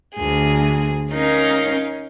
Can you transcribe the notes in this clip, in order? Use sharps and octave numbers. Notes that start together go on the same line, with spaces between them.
D2 G#4
C#4 D#4 A#4 F5